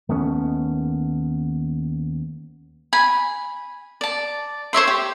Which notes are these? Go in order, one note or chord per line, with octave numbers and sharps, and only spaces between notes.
D#2 A3 B3 C#4
G#5 B5
D5 A5
C5 C#5 E5 C6
G4